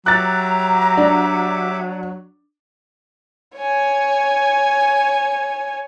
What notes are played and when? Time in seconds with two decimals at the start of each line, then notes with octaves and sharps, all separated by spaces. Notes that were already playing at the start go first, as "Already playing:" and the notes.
0.06 F#3 G4 E5 A#5 D6 F#6 A6
0.97 D4
3.56 C#5 G#5